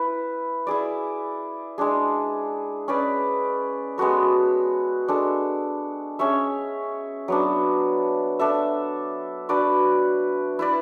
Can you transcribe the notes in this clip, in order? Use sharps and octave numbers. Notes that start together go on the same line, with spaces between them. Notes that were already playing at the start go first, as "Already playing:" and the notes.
Already playing: E4 B4
E4 G#4 D5
G#3 D4 G#4
C#4 G#4 B4 D5
G#3 B3 F#4 A4
G#3 D4 A4
C#4 G#4 C#5 E5
F#3 B3 D4
D4 A4 E5
D4 F#4 B4 D5
E4 B4 D5